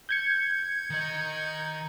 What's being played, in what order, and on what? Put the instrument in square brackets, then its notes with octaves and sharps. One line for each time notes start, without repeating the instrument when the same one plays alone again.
[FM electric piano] G6 G#6 C#7
[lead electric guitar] D#3 D#5